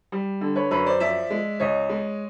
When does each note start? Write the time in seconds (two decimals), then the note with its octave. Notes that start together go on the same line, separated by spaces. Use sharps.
0.12 G3
0.41 D3
0.56 B4 C#5
0.71 F#2 B4 C#5
0.86 C5 D5
1.00 F3 D5 E5
1.30 G#3
1.60 C#2 C#5 D#5
1.89 G#3